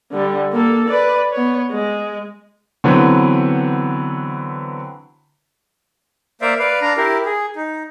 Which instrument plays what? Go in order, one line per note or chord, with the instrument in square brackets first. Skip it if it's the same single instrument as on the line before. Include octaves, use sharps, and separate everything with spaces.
[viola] D3 G3
A#3 A4
B4 D5
B3 C#5
G#3
[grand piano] D3 E3 F#3 B3 C4
[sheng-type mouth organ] A#3 C5 D5 E5 F5
B4 D5 F5
D4 F5 A#5
E4 G4 A#4
G#4
D#4